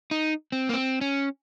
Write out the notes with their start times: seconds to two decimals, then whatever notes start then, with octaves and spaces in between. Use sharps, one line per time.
0.11 D#4
0.52 C4
0.69 A#3
0.73 C4
1.01 C#4